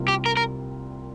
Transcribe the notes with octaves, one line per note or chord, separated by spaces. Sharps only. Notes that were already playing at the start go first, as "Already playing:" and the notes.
Already playing: C2 C3 G3 A#3 F4
G4
A#4
A#4